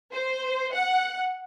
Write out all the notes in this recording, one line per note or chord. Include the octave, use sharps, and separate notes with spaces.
C5
F#5